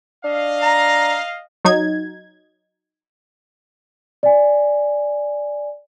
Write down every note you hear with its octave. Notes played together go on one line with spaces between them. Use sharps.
D4 D#5 F5
A#5
F#3 D#4 G#6
D5 G#5